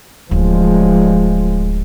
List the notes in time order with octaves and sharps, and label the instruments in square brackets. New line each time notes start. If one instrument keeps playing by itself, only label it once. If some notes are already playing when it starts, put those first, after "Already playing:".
[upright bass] D1 [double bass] F3 G#3